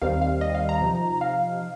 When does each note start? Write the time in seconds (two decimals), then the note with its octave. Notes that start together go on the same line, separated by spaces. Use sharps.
0.01 D#2 D#3 G3 C4 F5
0.22 F5
0.41 D#5
0.55 F5
0.69 A#5
0.81 C3 F3 D#4
1.21 F5